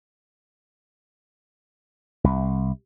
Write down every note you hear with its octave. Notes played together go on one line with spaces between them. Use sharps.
C2